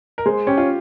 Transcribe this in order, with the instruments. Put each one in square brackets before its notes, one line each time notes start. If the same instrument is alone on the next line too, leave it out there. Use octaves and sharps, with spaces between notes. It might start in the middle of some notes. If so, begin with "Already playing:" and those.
[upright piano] A#4
[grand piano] G#3 [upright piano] C5
[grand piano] C#4 [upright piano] G4
[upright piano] F4